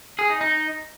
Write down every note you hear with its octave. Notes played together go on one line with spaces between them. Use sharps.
G#4
D#4
D#4